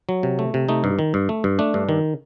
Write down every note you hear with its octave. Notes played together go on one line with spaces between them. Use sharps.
F#3
C3
A3
C3
A3 D#4
G2
D#3
G2
A3
G2
A3 D4
G2
D#3